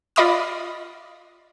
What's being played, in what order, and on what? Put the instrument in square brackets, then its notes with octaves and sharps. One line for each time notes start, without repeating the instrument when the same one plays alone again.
[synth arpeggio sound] F4 D5 D#5 B5 D6 D#6